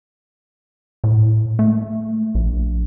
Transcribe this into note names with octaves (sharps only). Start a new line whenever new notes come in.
A2
A3
A#1